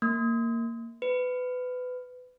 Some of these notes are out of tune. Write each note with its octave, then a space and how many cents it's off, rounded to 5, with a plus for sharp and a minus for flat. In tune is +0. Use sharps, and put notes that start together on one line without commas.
A#3 -15
B4 +25